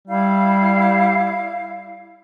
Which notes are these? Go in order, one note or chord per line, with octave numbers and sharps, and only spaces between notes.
G3 E4 F5